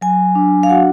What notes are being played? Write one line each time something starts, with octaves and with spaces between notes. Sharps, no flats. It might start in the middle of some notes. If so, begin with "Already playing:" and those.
F#3 G#5
D4
F5
F#4 F#5